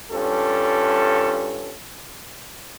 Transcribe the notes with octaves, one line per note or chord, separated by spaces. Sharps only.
G2 C#4 F4 A4